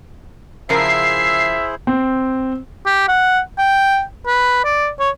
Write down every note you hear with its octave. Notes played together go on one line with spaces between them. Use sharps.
C#3 F3 E4 G#4 A#4 C5 E5 C7
C4
G4
F#5
G5
B4
D5
C#5